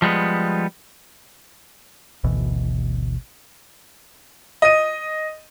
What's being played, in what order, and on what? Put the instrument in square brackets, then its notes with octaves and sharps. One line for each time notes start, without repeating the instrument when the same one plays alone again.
[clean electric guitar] F3 G3 G#3 B3
[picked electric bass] G#1 D2 B2 E3
[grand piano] D#5 D#7